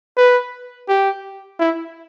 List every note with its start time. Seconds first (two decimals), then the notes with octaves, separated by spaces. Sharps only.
0.17 B4
0.88 G4
1.59 E4